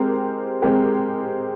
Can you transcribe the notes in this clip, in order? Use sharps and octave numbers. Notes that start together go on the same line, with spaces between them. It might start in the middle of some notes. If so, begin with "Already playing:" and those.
Already playing: G#3 C4 G4 A#4
G#3 C4 G4 A#4